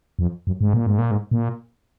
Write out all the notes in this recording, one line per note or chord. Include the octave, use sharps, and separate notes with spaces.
F2
F#2
G#2
A#2
G#2
A#2
G#2
A#2